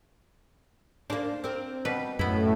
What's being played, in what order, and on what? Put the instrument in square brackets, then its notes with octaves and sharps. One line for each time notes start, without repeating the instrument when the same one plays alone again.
[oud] A#3 D4 [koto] C5
[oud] C4 A#4
[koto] B2 G3 B4
[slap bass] F#2 [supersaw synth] A2 [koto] B3 E4